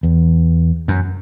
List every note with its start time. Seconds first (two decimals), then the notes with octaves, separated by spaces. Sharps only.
0.03 E2
0.88 F#2